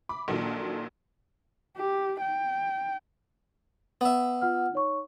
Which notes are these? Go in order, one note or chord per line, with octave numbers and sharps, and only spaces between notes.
B5 D6
A#1 A#2 D#3 F#3 A4
G4
G5
B3 E5
F4 F#5 F6
D#4 C#5 C#6